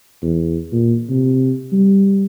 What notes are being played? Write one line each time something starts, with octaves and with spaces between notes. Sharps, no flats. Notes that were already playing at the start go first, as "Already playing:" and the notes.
E2
A#2
C3
G3